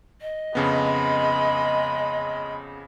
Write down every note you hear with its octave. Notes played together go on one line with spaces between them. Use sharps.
D#5
F2 C#3 G#3 B3 B5